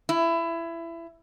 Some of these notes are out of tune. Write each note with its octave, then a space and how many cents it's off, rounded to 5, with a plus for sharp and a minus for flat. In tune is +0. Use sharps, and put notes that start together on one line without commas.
E4 +20